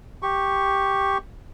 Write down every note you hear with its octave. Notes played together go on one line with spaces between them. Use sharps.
G4 C#6